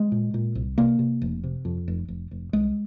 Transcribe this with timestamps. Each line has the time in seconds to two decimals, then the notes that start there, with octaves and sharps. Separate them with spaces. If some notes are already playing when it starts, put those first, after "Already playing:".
Already playing: G#3
0.12 A#2
0.34 A#2
0.55 C2
0.78 C3 A#3
0.99 C3
1.22 F1
1.44 C3
1.65 F2
1.88 F1
2.08 F1
2.31 F1
2.53 C2 G#3